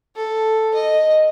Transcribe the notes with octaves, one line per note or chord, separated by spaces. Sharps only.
A4
D#5